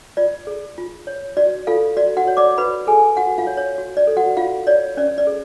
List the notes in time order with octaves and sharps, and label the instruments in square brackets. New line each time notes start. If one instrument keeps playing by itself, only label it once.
[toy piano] F4 D5
G#4
F4
C#5
F#4 D5
F4 A4 F5
F#4 D5
F#4 F#5
C#5
D5 D6
F#4 B4 B5
G#4 A4 G#5
F#4 F#5
F4 F5
C#5
C#5
F#4
D5
A4
F#4 F#5
F4 F#4 F5
C#5 D5
C#4 D5
D5
G#4